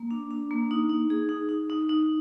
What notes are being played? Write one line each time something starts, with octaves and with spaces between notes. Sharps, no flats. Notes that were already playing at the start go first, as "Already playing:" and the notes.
Already playing: A#3
D4
D4
A#3
D#4
D#4
G#4
D#4
D#4
D#4
D#4